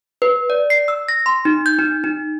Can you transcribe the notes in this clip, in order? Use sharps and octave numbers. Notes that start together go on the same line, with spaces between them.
B4
D5
C7
E6
A#6
C6
D#4
G6
D#4
D#4